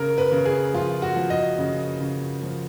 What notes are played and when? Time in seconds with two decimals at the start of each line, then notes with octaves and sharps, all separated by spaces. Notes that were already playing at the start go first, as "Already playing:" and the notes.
Already playing: C#3 A#4
0.18 B4
0.32 C#3
0.45 G#4
0.73 F3 F4
1.02 F#4
1.16 F3
1.30 D#5
1.58 C#3
2.00 C#3
2.43 F3